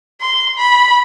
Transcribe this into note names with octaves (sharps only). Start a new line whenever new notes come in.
C6
B5